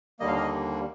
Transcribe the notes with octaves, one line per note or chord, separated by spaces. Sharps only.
D#2 D3 G3 A#3 D#5
F5
D#5